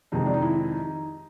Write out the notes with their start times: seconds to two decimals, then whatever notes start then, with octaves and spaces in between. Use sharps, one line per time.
0.12 F2 C3 D#3 G#3 D#4
0.26 D4
0.34 D#4
0.42 E4
0.72 D#4